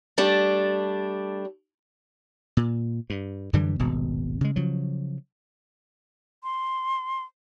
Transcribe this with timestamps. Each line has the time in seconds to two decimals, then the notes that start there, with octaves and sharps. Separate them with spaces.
0.18 G3 A3 D4
2.57 A#2
3.10 G2
3.53 F#2 D3 E3 G3
3.79 D#1 G#1 B2
4.41 C#3 G#3
4.56 C#3 F3 F#3
6.44 C6